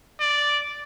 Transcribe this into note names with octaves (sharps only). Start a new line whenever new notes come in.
D5